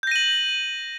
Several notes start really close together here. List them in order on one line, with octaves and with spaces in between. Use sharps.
G6 A#6 D#7 F#7